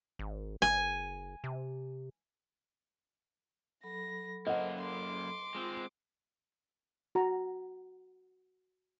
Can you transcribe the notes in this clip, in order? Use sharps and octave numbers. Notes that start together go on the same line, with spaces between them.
G#1
F#1 G#5
C3
F#3 A4 B5 A#6
F#2 A#3 C5 D#5 F#5
C6 D6
G#3 C4 F4
F#4 A#5